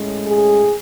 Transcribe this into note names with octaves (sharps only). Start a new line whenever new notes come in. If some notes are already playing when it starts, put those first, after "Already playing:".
Already playing: A2 G#3 C#4
G#4